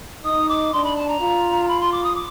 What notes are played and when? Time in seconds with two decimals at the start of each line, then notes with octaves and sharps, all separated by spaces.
0.24 D#4 D#6
0.48 D6
0.72 D4 C6
0.83 B5
0.96 A5
1.08 A#5
1.20 F4
1.68 B5
1.80 C6
1.91 D6
2.03 D#6
2.15 D6